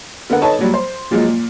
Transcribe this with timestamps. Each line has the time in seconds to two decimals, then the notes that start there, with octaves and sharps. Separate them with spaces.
0.30 D3 B3 A#4 F#5
0.42 D#4 A4 B4 C#5 A5
0.59 A#2 F#3 G3
0.74 C5
1.11 A#2 F3 F#3 G#3
1.28 A#2